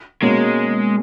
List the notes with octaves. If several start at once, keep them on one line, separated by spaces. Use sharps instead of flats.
B2 G#3 A#3 C#4